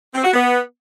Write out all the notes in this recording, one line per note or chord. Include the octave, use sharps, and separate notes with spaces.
C4
F#4
B3